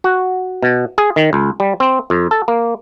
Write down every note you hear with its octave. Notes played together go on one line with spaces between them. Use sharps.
F#4
B2
G#4
D#3
C#2
G3
C4
F2
A4
A#3